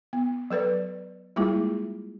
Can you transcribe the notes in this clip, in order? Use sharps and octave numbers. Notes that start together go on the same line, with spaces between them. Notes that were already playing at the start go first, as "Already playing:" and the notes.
B3
F#3 A4 B4 D5
G3 G#3 A#3 E4 F4 G#4